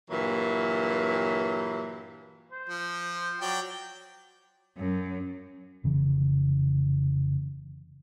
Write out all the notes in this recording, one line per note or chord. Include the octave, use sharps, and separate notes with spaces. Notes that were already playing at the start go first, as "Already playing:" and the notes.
G2 A#2 E3 F#3
C5
F3
F#3 D5 G5
F#2
F1 C#3 E3